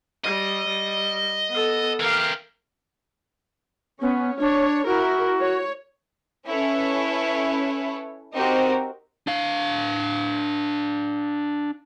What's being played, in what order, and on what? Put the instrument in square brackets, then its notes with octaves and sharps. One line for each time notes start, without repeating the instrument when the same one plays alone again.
[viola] G3 [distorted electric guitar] D#5
[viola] G3
B3 A4
[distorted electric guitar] E3 G4 [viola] A#4 F5
[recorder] B3 [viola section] C#4
[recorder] D4 [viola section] C#5
[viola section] E4 A#4 [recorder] F#4
[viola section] C#5
[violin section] C#4 E4 A4 B4 C#5
C4 D#4 F#4 G4 A#4 C5
[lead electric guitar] D4 F5